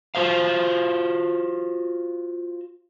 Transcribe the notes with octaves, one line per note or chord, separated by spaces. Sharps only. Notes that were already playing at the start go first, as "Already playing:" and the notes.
F4 F#4 C5 F5